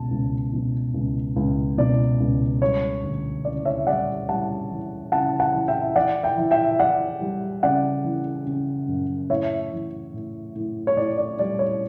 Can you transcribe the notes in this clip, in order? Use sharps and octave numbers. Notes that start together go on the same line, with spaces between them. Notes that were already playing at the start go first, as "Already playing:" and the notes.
Already playing: C#2 B2 A5
C#2
B2
C#2
C#2
B2 D5
C#2
G3 C#5
D2
C#3 D5
C#5 E5
G3 D5 F#5
G3 F#5 A5
E3
C#3 F#5 A5
F#5 A5
E3
E5 G5
E3 D5 F#5
E5 G5
E3
E5 G5
E3 D5 F#5
G3
C#3 D5 F#5
E3
C#3
F#2
A2 C#5 E5
E3
A2
A2
C#5
A2 D5
D5
G3 D5
C#5